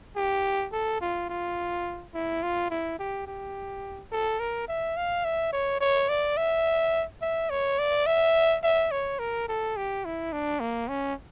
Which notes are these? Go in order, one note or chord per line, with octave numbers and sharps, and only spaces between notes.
G4
A4
F4
F4
E4
F4
E4
G4
G4
A4
A#4
E5
F5
E5
C#5
C#5
D5
E5
E5
C#5
D5
E5
E5
C#5
A#4
A4
G4
E4
D4
A#3
C#4